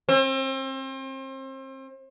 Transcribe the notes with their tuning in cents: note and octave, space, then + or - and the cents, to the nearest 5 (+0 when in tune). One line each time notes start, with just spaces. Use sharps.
C4 +35